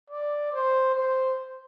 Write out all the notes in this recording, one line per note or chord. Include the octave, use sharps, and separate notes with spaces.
D5
C5
C5